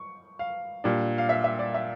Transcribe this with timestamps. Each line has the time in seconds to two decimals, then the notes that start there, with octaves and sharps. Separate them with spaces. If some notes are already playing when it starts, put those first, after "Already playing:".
Already playing: C#6
0.39 F5
0.84 A#2 G3 D4
1.18 F5
1.29 E5
1.44 E5
1.59 D5
1.74 E5